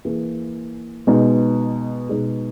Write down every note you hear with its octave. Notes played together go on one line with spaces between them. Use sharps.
E3 A#3 E4 G#4
B2 G#3 D#4
B2 G#3 D#4 G#4